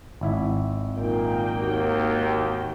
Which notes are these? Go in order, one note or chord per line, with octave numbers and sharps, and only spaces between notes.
G#1 E4 E5
A#2 A#3 D#4 G5
D#2 F#4